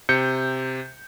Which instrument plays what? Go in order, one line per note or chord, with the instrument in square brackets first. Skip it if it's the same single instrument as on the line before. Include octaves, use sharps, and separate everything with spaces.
[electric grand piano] C3 G6 C#7